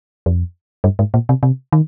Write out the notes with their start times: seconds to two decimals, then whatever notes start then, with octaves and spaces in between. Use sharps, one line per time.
0.26 F2
0.84 G2
0.99 G#2
1.14 A#2
1.29 C3
1.43 C3
1.72 D#3